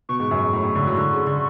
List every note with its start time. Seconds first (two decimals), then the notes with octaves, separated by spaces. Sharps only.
0.09 B2 C#6
0.20 G#2
0.31 F#2
0.43 G#2
0.53 A2
0.64 C#3
0.75 D3
0.87 F#3
0.97 D3
1.13 C#3
1.27 D3